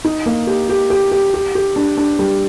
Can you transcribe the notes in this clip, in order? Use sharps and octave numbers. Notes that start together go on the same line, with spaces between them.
D#4
A#3
G4
G4
G4
G4
G4
G4
D4
D4
G3